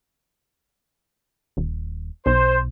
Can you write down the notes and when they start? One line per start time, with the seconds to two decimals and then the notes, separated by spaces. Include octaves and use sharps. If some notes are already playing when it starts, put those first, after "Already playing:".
1.57 D#1
2.26 B1 C5